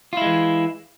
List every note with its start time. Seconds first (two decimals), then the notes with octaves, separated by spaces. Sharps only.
0.13 F4
0.17 E4
0.21 G#3
0.26 E3